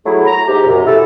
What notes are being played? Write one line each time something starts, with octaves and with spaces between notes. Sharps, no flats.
F#3 A3 E4 G#4
A#5
G#2 G4
F#2 C3
E4 F#4 A4